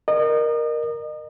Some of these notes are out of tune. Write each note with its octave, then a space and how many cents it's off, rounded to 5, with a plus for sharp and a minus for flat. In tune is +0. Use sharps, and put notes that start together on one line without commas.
A#4 +5 D#5 -35